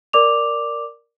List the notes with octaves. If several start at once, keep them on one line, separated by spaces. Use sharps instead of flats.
A#4 D5 D6 F7